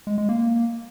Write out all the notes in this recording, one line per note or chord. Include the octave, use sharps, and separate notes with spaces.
G#3
G#3
A#3